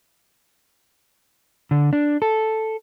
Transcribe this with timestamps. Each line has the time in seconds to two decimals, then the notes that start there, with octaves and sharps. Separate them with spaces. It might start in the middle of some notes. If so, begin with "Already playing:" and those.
1.71 D3
1.93 D4
2.22 A4